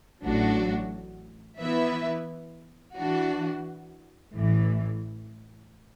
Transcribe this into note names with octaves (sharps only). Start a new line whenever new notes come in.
A1 A2 F#3 D4 F#4
E3 B3 E4 B4 E5
E3 D4 F#4
A1 A2 E3